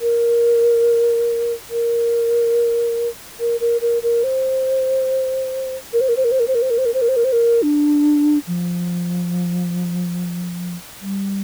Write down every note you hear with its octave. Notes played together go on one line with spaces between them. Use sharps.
A#4
A#4
A#4
A#4
A#4
A#4
C5
A#4
C5
A#4
C5
A#4
C5
A#4
C5
A#4
C5
A#4
C5
A#4
C5
A#4
C5
A#4
C5
A#4
D4
F3
G3